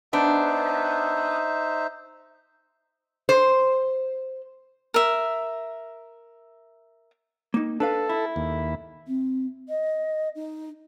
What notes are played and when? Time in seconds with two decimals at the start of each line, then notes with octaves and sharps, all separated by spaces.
0.13 B3 D4 D#4 C5 E5
3.29 C5
4.94 A#4 E5
7.54 A#3 D#4
7.80 D4 A4 B4 F5
8.09 E4
8.36 D#2
9.07 C4
9.68 D#5
10.35 D#4